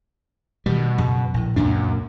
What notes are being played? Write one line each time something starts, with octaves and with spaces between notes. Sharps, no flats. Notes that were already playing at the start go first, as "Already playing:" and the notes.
B2 D#3 G3
F#2 C#3
A#1 A2
C#2 F#2 A#2 D4